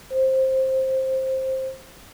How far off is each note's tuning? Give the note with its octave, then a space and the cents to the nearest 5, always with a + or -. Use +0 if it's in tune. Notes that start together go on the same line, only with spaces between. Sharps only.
C5 +10